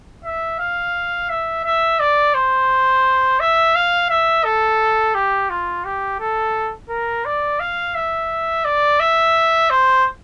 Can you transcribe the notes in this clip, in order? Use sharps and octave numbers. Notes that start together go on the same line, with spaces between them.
E5
F5
E5
E5
D5
C5
E5
F5
E5
A4
G4
F4
G4
A4
A#4
D5
F5
E5
D5
E5
C5